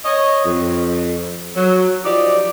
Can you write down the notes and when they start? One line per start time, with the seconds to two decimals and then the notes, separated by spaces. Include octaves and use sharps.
0.05 C#5 D#5
0.45 F2
1.56 F#3
2.05 F3 D#4 G4 D5